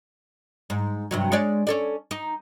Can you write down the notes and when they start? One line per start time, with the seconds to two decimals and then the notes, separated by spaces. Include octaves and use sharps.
0.70 G#2
1.11 G2 C3 F#3
1.32 G#3 C#5 D5
1.67 C#4 A4 D5
2.11 D#4